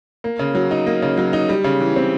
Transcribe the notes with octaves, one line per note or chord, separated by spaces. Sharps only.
A#3
C#3
F#3
D#4
A#3
C#3
F#3
D#4
G3
C#3
E3
C4